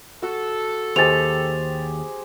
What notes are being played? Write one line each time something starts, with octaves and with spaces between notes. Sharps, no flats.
F#4 A4
D#2 G4 G#4 C5 A6 F7